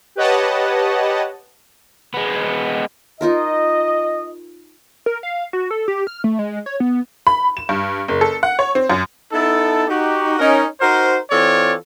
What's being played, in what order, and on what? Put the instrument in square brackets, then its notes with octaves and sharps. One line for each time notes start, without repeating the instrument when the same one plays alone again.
[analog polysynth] G4 B4 C#5 D#5 F#5 A5
[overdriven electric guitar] G#3 B3
[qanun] D#4 F4 A#4 [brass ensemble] D#5
[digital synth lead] A#4
F5
F#4
A4
G4
F6
A3
G#3
C#5
B3
[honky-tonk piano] B5
E7
G2
F#1
A4
F#5
C#5
C4
F#2
[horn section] B3 D#4 E4 A4
D#4 F#4 G4
C#4 D#4 A#4
D#4 F#4 A#4 C5
E3 C4 F4 A4 C#5 D5